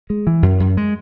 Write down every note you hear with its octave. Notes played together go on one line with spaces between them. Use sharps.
G#3
E3
F#2
F#2
G#3